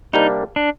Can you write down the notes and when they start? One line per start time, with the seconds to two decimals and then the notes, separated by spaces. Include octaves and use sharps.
0.13 C3 G3 A#3 D4 D#4
0.56 D4